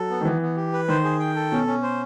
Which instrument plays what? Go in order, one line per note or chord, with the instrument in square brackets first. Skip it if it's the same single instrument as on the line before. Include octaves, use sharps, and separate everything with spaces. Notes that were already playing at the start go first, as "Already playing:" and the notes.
Already playing: [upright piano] F#3 [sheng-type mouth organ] A4
[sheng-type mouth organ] B3
[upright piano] D#3
[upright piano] E3 [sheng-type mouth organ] B3
[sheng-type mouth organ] B3
G4
B4
[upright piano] D#3 [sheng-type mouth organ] C5
[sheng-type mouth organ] G#4
G5
A4
[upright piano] B2 [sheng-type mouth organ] C#4
[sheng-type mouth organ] C#4
C5